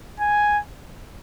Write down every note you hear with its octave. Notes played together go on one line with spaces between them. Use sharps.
G#5